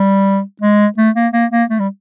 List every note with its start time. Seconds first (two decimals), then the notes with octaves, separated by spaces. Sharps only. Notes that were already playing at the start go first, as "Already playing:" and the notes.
Already playing: G3
0.61 G#3
0.97 A3
1.15 A#3
1.33 A#3
1.51 A#3
1.70 A3
1.79 G3